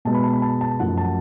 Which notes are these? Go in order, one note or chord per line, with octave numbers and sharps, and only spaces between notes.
B2 G#3 B3 A5
B5
A5
B5
A5
A5
F#2 F3 A3 F#5
A5